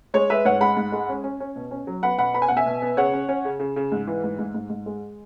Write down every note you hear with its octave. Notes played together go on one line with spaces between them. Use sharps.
G#3 C#5
G#3 B4 E5
G#2 C#5 F#5
G#3 F#5 B5
G#2
G#3
C#4
C#4
C#4
B2
C#4
F#3
B3 F#5 B5
B2 F#5 B5
B3 B5
G#5
B2 F#5
E5 G#5
B2
B3
C#3 C#5 F#5
C#4
C#4
C#3
C#3
C#3
G#2
E3
G#2
G#2
G#2
G#2
G#3